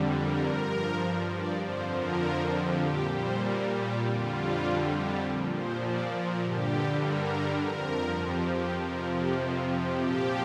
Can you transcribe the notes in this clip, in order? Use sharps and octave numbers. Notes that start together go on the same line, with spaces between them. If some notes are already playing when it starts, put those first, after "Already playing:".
Already playing: F2 D3 G3
A#4
G2 F3
D5
F2 D3 F3 C5
A#4
G4
A#2 G3 G4
C5
A#4
G4
F2 D3 G3 F4
G4
A#2 F3
C5
D5
A#4
G2 D3 G3 G4
A#4
F2 F3 A#4
G4
G4
F2 C3 F3 A#4
G4
F4
G4
A#2 F3 G4